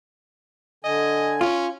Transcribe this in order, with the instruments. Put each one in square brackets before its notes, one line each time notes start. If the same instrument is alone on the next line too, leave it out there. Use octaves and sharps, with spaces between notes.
[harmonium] D3 G#5 [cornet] D#5
[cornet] C#4 [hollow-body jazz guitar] F4